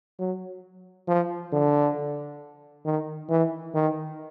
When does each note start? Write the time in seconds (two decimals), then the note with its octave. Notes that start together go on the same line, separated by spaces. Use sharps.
0.19 F#3
1.08 F3
1.53 D3
2.85 D#3
3.29 E3
3.74 D#3